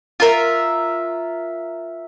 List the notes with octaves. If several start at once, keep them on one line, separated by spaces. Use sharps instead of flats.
F4 A#4 E5